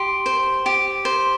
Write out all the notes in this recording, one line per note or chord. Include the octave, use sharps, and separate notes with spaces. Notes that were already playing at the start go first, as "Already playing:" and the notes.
Already playing: G4 C6
C5
G4
C5